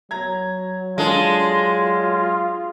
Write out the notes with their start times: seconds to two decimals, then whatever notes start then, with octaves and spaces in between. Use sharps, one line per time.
0.11 F#3 A#5 G#6
0.98 G#3 D4 F4 A4